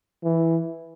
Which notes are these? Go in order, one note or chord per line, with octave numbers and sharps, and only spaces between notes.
E3